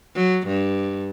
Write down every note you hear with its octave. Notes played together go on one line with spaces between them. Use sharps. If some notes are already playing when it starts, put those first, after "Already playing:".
F#3
G2